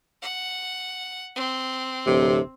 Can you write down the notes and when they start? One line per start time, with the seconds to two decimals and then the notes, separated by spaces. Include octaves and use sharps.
0.22 F#5
1.36 C4
2.06 D1 C3